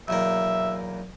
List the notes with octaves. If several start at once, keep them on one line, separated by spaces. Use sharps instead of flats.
B1 E2 A#3 E5